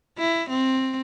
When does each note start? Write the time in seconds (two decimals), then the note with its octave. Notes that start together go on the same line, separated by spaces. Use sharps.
0.18 E4
0.49 C4